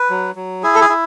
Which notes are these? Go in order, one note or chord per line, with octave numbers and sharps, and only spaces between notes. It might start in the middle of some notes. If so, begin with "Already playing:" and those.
Already playing: B4
F#3
F#3
E4 G#4
A4
G#4
E4